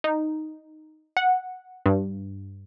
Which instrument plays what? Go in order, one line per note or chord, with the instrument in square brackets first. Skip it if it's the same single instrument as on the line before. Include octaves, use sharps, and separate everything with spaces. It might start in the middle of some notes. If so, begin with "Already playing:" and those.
[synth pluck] D#4
F#5
G2